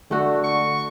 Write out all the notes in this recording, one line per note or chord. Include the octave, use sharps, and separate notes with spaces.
D3 A3 F#4
C#6